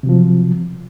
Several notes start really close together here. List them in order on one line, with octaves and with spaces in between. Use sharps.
C3 F#3 F3